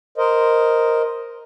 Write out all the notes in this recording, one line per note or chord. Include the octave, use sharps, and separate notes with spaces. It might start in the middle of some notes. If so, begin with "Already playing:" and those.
A#4 C5 D#5